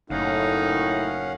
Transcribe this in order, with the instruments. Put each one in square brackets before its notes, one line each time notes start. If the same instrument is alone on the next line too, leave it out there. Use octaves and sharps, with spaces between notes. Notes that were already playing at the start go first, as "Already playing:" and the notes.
[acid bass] F#1 [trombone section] A2 [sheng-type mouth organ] C#4 F5 F#5 [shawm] D#4